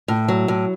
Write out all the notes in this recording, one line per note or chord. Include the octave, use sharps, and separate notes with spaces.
A2
F#3
A2